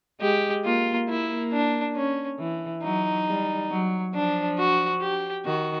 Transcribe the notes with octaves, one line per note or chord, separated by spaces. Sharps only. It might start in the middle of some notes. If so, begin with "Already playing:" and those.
G#3 G4
A#3 F4
A#3 E4
D4
C#4
E3
F#3 D#4
G3
F#3
F3 D4
F#4
G4
D#3 F#4